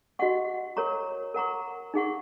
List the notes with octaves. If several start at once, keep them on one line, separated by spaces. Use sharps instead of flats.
F#4 D#5 F#5 C#6
A#4 C#5 A#5 C#6
A#4 F#5 A#5 C#6
D#4 G#4 F#5 C#6